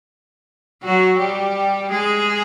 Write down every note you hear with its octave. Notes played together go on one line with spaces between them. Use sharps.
F#3 F#4
G3 G4
G#3 G#4